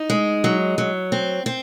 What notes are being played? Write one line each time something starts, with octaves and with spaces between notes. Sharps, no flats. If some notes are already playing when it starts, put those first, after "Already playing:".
Already playing: D#4
G#3
F#3
F#3
C4
C4